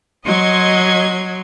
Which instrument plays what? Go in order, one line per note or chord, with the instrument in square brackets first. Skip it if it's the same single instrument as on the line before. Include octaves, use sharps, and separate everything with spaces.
[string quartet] F#3 [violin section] D#5 C6 G#6